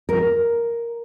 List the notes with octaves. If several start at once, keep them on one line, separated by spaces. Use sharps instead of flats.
A#4